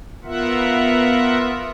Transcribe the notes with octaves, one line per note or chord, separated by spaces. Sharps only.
B3 F4 A#4 E5 F#5